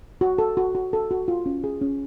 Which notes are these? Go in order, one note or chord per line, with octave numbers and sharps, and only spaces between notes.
F#4
A4
F#4
F#4
A4
F#4
F4
C#4
G#4
C#4